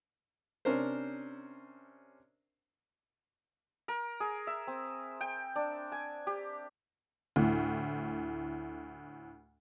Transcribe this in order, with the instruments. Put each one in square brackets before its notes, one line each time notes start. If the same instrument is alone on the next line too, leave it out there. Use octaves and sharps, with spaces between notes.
[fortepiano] C3 C#4 D4 A#4 C5
[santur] A#4
G#4
E5
C4
G5
D4
G#5
G4
[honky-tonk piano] D2 A2